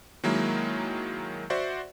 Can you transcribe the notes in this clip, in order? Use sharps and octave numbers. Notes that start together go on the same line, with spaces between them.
D#3 F#3 G#3 A#3 E4
F#4 C5 D5 E5 F#5